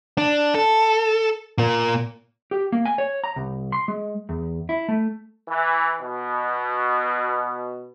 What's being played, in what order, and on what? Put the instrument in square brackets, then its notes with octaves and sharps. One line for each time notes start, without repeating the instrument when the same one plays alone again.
[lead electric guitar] D4
A4
A#2 A#3
[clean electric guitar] G4
A#3
G#5
C#5
A#5
C2
C6
G#3
E2
E4
A3
[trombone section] E3
B2